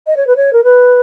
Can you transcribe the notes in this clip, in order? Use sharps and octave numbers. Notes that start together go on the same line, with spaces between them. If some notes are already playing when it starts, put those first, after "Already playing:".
D#5
C#5
B4
C#5
A#4
B4